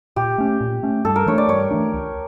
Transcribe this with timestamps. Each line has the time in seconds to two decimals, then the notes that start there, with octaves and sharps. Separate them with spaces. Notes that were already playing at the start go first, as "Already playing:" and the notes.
0.16 A#2 G4
0.38 A3 C#4
0.61 A#2
0.83 A3 C#4
1.05 G2 A4
1.16 A#4
1.26 E3 A3 D4 C#5
1.38 D5
1.48 G2 C#5
1.71 E3 A3 D4
1.94 C#2